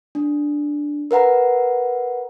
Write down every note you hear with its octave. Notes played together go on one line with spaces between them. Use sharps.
D4
A#4 B4 F#5 A#5